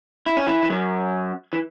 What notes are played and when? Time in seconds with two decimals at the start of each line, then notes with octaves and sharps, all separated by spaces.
0.26 E4
0.37 C#4
0.47 E3 E4
0.63 E3
0.70 F#2 F#3
1.53 E3